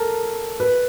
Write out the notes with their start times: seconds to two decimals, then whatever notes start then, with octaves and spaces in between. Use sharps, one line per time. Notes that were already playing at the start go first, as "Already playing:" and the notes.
Already playing: A4 A#4
0.60 B4